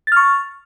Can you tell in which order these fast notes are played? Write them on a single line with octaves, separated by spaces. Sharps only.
A6 F6 C#6